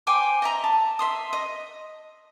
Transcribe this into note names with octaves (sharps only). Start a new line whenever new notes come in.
C5 G5 G#5 D6
D#5 E5 A#5
A5
E5 C6 D#6
D#5